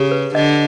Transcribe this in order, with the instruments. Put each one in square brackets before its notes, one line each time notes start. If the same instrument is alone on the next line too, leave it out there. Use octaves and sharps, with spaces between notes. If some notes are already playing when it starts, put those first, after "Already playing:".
Already playing: [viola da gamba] C#3 [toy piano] G4
[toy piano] B4
[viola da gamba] D3 [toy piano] D#5